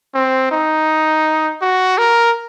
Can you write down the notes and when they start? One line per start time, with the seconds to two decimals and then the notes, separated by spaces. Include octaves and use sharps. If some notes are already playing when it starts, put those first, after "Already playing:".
0.14 C4
0.51 D#4
1.62 F#4
1.98 A#4